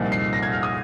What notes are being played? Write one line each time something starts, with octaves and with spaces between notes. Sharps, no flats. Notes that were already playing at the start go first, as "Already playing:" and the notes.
Already playing: C2 A#2 F3 A#3 D#4
C7
A#6
G#6
F6
D#6